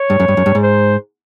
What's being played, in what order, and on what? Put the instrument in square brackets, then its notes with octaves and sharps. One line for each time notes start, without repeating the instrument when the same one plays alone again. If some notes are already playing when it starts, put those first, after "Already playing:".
Already playing: [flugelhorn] C#5
[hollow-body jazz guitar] G2
F#2
G2
F#2
G2
G#2
[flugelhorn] C5